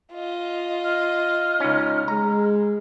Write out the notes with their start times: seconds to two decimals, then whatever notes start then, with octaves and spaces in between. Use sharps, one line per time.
0.12 F4 D#5
0.84 F6
1.60 C#2 C#4 D#4
2.08 G#3 A#5